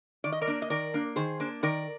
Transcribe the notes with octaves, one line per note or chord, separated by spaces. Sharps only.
D#3 D5
D#5
A#4 D5
A#3 D4
D#5
D#3 A#4 D5
A#3 D4
D#3 G#4 C5
A#3 D4
D#3 A#4 D5